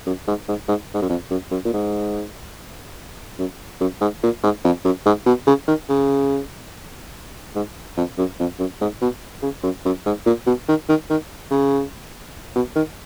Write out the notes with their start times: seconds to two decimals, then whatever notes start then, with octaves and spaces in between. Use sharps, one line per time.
0.06 F#2
0.27 G#2
0.48 G#2
0.68 G#2
0.94 G#2
1.02 F#2
1.10 F2
1.30 F#2
1.51 F#2
1.65 A#2
1.73 G#2
3.39 F#2
3.81 F#2
4.01 G#2
4.23 A#2
4.43 G#2
4.65 F2
4.85 F#2
5.06 G#2
5.26 B2
5.47 C#3
5.68 D#3
5.89 C#3
7.55 G#2
7.97 F2
8.18 F#2
8.40 F2
8.59 F#2
8.81 G#2
9.02 B2
9.42 C#3
9.63 F#2
9.85 F#2
10.06 G#2
10.26 A#2
10.47 B2
10.68 D#3
10.89 D#3
11.10 D#3
11.51 C#3
12.56 B2
12.76 D#3